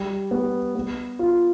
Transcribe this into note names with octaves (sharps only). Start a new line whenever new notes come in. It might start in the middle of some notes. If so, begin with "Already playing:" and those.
Already playing: G3
B3
B3
F4